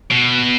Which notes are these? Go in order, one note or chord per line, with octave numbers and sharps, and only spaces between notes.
B2